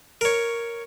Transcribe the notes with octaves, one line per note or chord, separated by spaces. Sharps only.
A#4 C#5